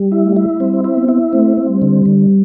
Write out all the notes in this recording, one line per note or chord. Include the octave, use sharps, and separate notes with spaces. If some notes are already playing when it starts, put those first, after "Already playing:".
Already playing: G3
E4
A3
E4
G3 C4
E4
B3
E4
A3 C4
C4
G3
D3
D3